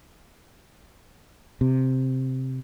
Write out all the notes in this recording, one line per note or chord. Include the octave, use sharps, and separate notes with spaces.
C3